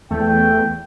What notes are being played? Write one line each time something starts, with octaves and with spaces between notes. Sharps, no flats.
E2 A3 G5